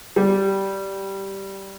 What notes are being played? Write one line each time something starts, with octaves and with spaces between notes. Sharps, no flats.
G3